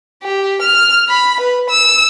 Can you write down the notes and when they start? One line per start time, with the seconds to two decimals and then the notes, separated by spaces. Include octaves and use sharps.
0.23 G4
0.62 F6
1.09 B5
1.41 B4
1.70 E6